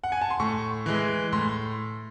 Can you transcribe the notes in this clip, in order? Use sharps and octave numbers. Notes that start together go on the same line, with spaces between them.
F#5
G#5
A5
C6
A2 C#6
E3 G#3
A2 C6